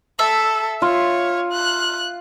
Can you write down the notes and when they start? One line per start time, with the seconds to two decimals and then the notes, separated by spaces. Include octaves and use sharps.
0.19 A4 E5
0.82 F4 C#5
1.52 F#6